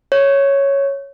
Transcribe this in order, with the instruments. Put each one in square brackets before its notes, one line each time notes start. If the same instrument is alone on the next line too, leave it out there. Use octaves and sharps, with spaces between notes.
[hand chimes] C#5